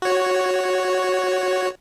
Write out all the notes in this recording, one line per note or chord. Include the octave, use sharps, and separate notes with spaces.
F#4 C#5